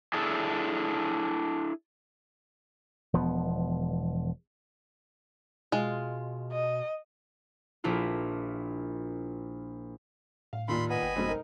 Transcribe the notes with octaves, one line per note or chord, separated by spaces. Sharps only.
D4 E4 G#4 A4
E1 F3 B3
B2 G#3 F4
D#5
A#1 D4 E4 F4
A2 F5
D#2 A#2 B5 C6
B3 D#5 G#5 B5
G1 G5
F2 G#2 B2 C4
D#4 A#4